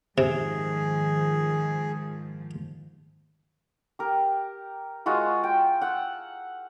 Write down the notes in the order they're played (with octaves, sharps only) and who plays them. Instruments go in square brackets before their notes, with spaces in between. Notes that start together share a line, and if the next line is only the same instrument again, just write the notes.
[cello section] G#2 D#3 F3 [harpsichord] C3 [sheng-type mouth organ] G#4
[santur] G4 A#4
G#3 F4 F#4 A#4
G5
F#5 E6